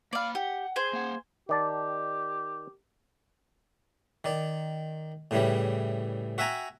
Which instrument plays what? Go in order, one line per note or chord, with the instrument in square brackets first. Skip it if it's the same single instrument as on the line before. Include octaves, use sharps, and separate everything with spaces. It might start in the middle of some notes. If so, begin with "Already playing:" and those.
[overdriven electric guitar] A#3 B5 [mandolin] D5 F5
[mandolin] G4 [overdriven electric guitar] F#5
[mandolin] G#4 C5
[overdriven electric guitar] A#3 F#5
[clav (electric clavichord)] D#3 D5 A5 [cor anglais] G4
[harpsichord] D#3 D5
A2 C#3 E3 G3
F#4 E5 G5 G#5 A#5